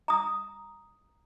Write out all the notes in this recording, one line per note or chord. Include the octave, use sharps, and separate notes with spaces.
A#5 D#6